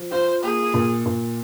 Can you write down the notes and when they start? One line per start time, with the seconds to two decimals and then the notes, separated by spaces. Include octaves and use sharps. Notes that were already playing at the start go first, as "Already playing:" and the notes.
Already playing: F3
0.11 F4 C5
0.43 A#3 G#4
0.74 A#2
1.06 A#2